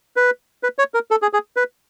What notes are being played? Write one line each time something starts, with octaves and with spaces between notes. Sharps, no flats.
B4
B4
C#5
A#4
A4
G#4
G#4
B4